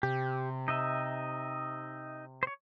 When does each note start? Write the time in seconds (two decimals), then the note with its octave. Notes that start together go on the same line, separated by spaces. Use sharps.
0.03 C3 G4
0.68 D#4 D#5 E5
2.43 C5 C#5